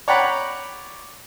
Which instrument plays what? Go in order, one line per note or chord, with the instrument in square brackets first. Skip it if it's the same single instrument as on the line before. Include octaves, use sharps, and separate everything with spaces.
[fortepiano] C#5 D5 F#5 G5 A#5 B5